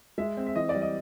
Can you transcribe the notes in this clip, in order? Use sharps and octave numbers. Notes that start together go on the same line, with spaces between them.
G#3 E5
C4
E5
E3 D#5
D5
G3
D#5